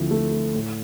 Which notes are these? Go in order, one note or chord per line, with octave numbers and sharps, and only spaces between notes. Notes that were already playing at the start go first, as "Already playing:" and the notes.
Already playing: D2 F3 C4 E4
A3
A3
A2